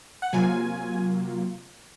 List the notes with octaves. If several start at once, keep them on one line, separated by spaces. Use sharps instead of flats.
F#5
C3 F#3 A#3 F4 G#5